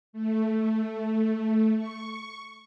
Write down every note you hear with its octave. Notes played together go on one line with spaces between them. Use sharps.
A3
C#6